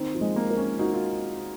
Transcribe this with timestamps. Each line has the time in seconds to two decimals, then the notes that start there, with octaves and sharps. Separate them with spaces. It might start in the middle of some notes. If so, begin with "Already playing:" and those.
Already playing: D#3 C4
0.15 F3
0.21 G#3
0.36 A#3
0.50 A#4
0.58 C#4
0.79 D#4 F#4
0.94 F4